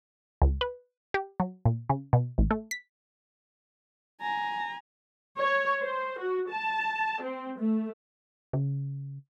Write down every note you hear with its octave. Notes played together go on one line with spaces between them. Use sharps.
C#2
B4
G4
F#3
A#2
C#3
B2
A1
A3
B6
G#5 A#5
C#5
C5
F#4
A5
C4
A3
C#3